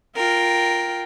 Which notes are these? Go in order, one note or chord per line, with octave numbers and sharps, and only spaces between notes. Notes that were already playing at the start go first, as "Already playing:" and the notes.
F4 A#4 G5